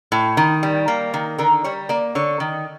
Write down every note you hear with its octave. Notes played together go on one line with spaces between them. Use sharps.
A2
D#3
G3
A#3
D#3
D3 A#4
G3 C#5
A#3 D5
D3 C#5
D#3